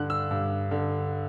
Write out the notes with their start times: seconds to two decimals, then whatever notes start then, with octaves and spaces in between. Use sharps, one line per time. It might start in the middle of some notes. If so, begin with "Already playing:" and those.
Already playing: G2 D3 F#6
0.10 E6
0.31 G2
0.71 D3